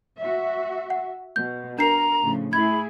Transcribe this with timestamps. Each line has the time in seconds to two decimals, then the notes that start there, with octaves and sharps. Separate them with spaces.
0.19 F#4 E5
0.90 F#5
1.36 B2 G6
1.79 D4 A#4 A#5 C7
2.22 A2 C#3 F3
2.53 A3 E4 G#4 B5 G#6